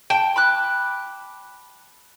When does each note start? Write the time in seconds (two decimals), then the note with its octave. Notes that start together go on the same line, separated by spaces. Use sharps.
0.10 G5 A5 D7
0.36 B5 D6 F#6